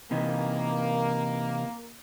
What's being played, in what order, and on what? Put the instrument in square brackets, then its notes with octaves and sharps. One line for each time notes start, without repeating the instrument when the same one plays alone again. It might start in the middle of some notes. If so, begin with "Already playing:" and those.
[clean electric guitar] C3 E3 D#4 [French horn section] A#3